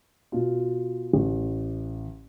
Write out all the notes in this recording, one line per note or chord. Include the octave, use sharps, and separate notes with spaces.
B2 F4
A1